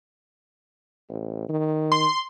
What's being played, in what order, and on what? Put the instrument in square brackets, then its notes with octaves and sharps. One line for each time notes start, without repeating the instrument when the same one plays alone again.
[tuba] A1
D#3
[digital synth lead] C6